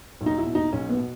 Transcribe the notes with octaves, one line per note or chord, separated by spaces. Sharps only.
B1
D#4
E4
B2
D#4
B1 C#4
B3
B2